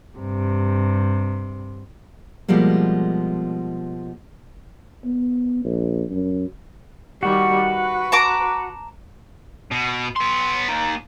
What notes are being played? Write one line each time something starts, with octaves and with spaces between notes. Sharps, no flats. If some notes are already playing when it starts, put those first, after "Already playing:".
G2 C3
B2 F3 G3 G#3 A#3
B3
A#1
F#2
D#3 G3 F#4
B4
A5 A#5 D6
B2
B3 C6
A#3 D#4